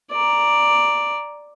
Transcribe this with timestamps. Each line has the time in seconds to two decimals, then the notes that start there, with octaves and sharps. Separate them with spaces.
0.11 D5 A#5